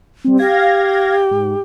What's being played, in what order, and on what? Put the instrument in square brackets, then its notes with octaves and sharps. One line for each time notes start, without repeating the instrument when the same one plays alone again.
[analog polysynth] G3 C4
[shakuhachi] G4 [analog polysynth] F5 G#6 A#6
[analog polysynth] G#2